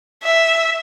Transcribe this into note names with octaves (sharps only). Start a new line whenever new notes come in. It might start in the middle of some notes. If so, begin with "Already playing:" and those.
E5